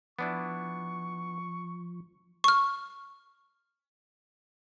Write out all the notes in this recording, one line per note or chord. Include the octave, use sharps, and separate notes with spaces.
F3 B3 D4 E4 C#6
C#6 F6